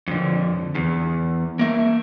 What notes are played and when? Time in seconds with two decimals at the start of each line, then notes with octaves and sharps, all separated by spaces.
0.08 F2 D3
0.75 E2
1.59 A#3 E5